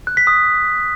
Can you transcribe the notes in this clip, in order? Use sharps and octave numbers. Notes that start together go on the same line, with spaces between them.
F#6
B6
D#6